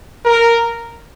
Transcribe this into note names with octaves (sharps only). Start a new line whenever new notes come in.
A#4